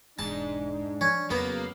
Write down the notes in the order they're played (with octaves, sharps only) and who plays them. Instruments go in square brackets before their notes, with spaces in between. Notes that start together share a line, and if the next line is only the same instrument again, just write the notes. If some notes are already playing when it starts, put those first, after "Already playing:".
[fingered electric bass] E1 [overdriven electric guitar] G#2 [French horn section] D4 [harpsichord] A5
[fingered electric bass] F3 [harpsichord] C#4
[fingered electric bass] F2 [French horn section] C#3 F#3 [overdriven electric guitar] A#3 [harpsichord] B3